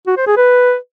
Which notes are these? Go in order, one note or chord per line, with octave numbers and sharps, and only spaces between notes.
F#4
C5
G#4
B4